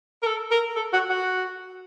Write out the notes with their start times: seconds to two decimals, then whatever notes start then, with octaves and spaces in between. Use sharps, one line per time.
0.22 A#4
0.27 A4
0.51 A#4
0.76 A4
0.93 F#4
1.09 F#4